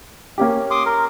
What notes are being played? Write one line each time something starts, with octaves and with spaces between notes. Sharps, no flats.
A#3 C#4 G4
C6 D6 D#6
A#4